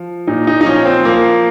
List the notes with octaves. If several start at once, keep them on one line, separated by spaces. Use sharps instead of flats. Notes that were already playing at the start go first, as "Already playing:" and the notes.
Already playing: F3
A#2 D#4
D#4
D#4
F3 C#4
C4
F3 A#3